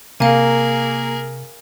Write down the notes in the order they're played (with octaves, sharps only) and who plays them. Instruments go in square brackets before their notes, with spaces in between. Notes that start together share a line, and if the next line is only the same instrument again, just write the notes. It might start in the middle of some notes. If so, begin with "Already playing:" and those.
[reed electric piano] C3 [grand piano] A#3 [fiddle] G#4 A#4 [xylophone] F5 G#5